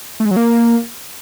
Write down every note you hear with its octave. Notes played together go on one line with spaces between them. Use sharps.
A3
G#3
F#3
A#3